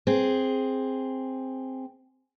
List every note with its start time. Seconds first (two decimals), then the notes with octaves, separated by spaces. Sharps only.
0.07 C4 G#4